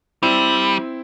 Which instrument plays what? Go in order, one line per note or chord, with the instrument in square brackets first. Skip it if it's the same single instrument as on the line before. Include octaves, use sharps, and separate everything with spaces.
[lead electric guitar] G3 [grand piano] C4 E4